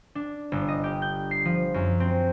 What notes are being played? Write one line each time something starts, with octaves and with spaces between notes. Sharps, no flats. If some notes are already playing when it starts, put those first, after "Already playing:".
D4
G1
D#5
G4
G6
C7
F3
F#2
C4